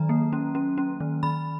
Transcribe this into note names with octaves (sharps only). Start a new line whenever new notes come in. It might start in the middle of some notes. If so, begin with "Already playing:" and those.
Already playing: D#3 F#3 A#5
A#3
C#4
C#4
C#4
D#3
D#3 B5